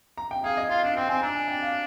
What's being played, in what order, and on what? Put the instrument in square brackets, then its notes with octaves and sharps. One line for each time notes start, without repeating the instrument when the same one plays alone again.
[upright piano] A#5
G5
[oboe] G#4 [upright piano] F5
[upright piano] D#5
[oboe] F4 [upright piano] F5
[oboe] D4 [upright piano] F5
[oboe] C4 [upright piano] G5
[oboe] C4 [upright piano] G#5
[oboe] D4 [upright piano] A#5
[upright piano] G#5
G5
F5